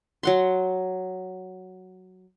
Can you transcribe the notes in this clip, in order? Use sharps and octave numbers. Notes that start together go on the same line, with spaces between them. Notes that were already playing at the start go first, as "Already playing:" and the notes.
F#3 F#5 C6